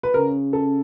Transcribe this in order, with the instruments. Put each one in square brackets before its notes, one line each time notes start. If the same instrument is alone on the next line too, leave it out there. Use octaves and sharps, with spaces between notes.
[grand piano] B4
[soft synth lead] C#3 [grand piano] A#4
[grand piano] A4